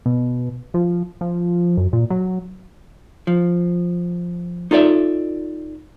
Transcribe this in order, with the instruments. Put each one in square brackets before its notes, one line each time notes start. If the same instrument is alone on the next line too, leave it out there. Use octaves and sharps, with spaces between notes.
[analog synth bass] B2
F3
F3
F#2
A#2
F#3
[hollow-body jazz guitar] F3
D#4 F4 A4 D5 E5